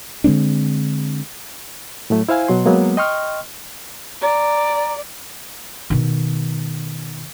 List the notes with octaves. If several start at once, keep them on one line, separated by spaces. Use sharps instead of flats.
D3 G#3 C4 D4
A2 F#3 A3
E4 C5 F5 G#5
B2 F#3 C6
F#3 G#3 A#3 B3
D#5 G5 C6 C#6 F6
D5 A#5
B2 D#3